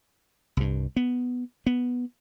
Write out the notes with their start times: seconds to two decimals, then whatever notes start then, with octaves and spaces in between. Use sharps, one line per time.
0.57 C2 G2
0.96 B3
1.66 B3